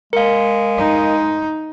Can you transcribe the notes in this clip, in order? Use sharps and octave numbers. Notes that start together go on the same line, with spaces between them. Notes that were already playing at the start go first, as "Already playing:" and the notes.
G#3 A#4 F5 C#7
D#4